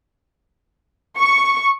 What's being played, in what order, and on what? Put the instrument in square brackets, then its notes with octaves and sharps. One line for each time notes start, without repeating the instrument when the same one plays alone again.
[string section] C#6